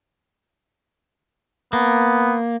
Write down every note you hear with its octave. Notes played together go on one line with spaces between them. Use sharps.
A#3 B3